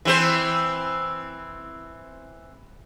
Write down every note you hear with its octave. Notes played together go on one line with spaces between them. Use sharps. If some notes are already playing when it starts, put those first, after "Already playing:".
E3 C4 C5